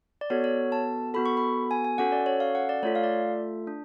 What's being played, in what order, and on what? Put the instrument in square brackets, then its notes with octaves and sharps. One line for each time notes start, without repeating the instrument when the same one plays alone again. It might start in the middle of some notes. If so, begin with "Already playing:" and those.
[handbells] D5
B3 F#4 A4 C#5
C#5
A5
B3 F#4 A4 B5
C#6
B5
G#5
G#5
C#4 F#4 A4 F#5
D5
C#5
F5
F#5
D5
A3 F4 A4 C#5
F5
D5
D4